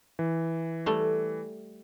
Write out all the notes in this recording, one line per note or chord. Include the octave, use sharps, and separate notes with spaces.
E3
G3 A3